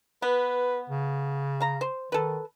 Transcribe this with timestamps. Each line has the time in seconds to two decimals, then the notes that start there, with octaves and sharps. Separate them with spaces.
0.22 B3 B4
0.90 C#3
1.60 F5 A#5
1.81 C5
2.12 D#3 A4 B4